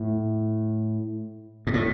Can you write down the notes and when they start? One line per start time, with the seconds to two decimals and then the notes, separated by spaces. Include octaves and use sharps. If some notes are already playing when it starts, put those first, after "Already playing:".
Already playing: A2
1.67 G#2
1.74 A2